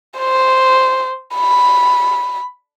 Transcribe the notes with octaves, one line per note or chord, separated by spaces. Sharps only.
C5
B5